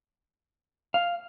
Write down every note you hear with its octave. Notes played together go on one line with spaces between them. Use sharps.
F5